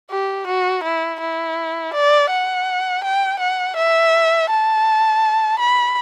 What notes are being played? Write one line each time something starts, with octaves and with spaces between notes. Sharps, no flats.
G4
F#4
E4
E4
D5
F#5
G5
F#5
E5
A5
B5